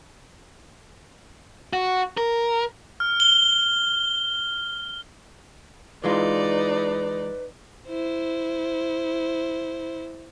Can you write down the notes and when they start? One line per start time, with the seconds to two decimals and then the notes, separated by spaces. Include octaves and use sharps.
1.73 F#4
2.17 A#4
3.00 F6
3.20 G7
6.04 E3 G#3 D#4 F4 B4 D5
7.89 E4 C5